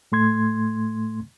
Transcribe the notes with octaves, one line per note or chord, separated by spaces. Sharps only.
A2 A3 C6 G#6